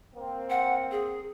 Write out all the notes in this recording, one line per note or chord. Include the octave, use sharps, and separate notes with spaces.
A#3 C4
F#5
G#4